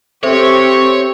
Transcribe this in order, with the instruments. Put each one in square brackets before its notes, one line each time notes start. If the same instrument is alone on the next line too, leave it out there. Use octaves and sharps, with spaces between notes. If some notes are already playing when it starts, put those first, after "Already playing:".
[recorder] C4 [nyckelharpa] G4 [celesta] A4 C5 E5 [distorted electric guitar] C#5